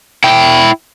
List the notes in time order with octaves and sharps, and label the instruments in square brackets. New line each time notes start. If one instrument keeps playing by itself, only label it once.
[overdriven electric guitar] E4 G5